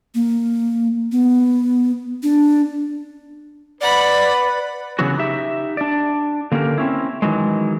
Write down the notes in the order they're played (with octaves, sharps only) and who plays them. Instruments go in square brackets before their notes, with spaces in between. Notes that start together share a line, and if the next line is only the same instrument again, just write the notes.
[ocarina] A#3
B3
D4
[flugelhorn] B4 [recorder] D5 [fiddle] F#5 B5
[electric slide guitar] C#3 E3 F#3 B3 F#4
D#4 G4 E5
D4 D5
D3 A#3 C#4 G4 A#4
C4 C#4 E4
D#3 E3 F#3 G#3